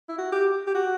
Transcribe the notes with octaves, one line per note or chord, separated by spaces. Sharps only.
E4
F#4
G4
G4
F#4